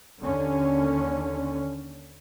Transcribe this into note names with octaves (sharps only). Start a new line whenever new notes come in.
D#2 D3 C#4